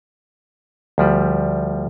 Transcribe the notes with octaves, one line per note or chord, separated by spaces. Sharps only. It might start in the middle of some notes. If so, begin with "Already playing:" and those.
D2 F3 G3